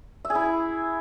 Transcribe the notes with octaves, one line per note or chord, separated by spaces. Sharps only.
E5
G#4
E4